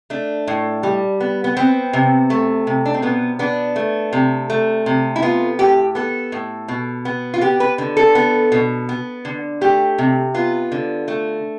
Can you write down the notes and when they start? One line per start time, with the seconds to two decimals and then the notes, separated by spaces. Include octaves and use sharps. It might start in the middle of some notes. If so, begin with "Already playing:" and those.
0.10 A3 D4
0.48 A2
0.83 G3
1.20 B3
1.44 B3
1.57 B3 C4
1.93 C3
2.30 A3
2.67 C3
2.86 D4
2.94 C4
3.02 B2 B3
3.39 B3 D4
3.76 A3
4.13 C3
4.50 A3
4.86 C3
5.16 E4
5.22 B3 F4
5.59 A2 G4
5.95 B3 A4
6.32 A2
6.68 B2
7.05 B3
7.34 F4
7.41 B3 G4
7.60 B4
7.78 D3
7.97 A4
8.15 B3
8.52 B2
8.89 B3
9.25 D3
9.61 A3 G4
9.98 C3
10.34 B3 F4
10.72 D3
11.08 A3